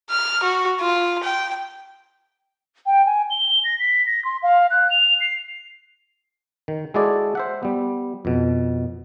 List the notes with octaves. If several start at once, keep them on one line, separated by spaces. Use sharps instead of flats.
F6
F#4
F4
G5
G5
G#5
G7
A#6
B6
A#6
C6
F5
F#6
F7
C7
D#3
G#3 E4 F#4 G#4 A4 D5
C5 E5 F#5
G3 B3
F2 B2